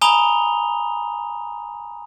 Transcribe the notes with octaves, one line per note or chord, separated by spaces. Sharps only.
G#5 A#5 B5 D#6 F7 G7